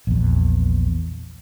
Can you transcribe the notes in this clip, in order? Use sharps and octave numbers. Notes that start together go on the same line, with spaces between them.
A#1 E2